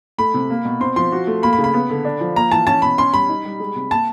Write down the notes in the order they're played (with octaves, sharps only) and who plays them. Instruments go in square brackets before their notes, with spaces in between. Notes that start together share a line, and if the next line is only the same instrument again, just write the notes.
[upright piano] A3 [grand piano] B5
[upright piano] C3
A#3
B2
[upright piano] C4 [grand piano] C6
[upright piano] F3 [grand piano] C6
[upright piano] F#4
A3
[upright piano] A#3 [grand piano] B5
[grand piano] B5
[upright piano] C#3
[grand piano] B5
[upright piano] B3
D3
D4
F3
[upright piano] A#3 [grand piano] A#5
[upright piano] E3 [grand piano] A5
[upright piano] C#4 [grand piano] A5
[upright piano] B2 [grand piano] B5
[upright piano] C#4 [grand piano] C6
[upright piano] G3 [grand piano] B5
[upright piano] D#4
G3
G#3
C3
[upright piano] A#3 [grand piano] A5